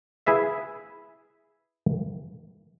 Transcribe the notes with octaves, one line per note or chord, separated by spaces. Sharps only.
E4 G#4 B4 E5 F5